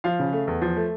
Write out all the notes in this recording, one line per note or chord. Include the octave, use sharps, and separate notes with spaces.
F3 F5
C#3
A3
E2
F3
A3